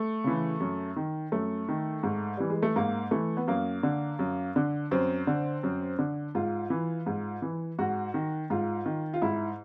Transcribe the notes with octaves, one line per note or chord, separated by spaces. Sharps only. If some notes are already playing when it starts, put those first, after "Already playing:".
Already playing: A3
C#3 E3
F#2
D#3
F#2 A3
D#3
G#2
E3 G3
G#3
A3
G#2 A#3
E3 A3
B3
F#2 A#3
D3
F#2
D3
F#2 C4
D3
F#2
D3
G#2 F4
E3
G#2
E3
G#2 F#4
D#3
G#2 F4
D#3
F4
G#2 E4